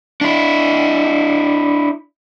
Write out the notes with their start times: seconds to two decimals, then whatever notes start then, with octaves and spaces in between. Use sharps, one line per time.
0.21 D4 E4